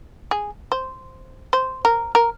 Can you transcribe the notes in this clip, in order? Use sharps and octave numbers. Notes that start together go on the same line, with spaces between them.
G#4
C5
C5
A#4
A#4